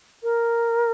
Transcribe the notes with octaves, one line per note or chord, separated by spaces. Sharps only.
A#4